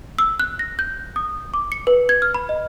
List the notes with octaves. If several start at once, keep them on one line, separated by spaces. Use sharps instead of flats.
E6
F#6
A#6
G6
D#6
D6
C#7
B4
G#6
F6
B5
D#5